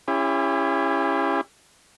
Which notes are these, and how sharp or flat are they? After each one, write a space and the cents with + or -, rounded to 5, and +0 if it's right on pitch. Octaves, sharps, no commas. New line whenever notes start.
C#4 +0 E4 +25 G4 +45